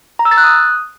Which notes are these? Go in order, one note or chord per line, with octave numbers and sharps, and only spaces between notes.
A#5
E6
A6
F#6
D#6